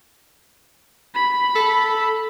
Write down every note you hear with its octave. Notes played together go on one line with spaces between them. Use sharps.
B5
A4